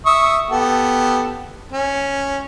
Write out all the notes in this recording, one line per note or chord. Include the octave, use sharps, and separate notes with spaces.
E5 C#6 D#6
B3 G4 A4
C#4